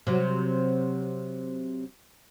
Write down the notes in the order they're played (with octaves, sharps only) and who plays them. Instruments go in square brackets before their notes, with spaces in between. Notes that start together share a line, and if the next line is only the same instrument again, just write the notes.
[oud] C3 F#3